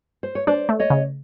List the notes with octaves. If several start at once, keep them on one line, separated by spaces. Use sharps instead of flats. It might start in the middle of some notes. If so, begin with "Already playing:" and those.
C5
C#5
D4 C5 D5
A3
C#5 D#5
C#3